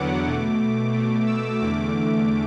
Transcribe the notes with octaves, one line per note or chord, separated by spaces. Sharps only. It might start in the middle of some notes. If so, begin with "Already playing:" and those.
Already playing: E2 D3 F#3 B3 F#5 D6
B2 A3
B2 A3
E6
E2 D3 A3 D6